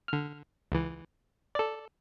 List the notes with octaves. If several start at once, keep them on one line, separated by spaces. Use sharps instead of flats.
D3 F6
C#2 E3
A4 D5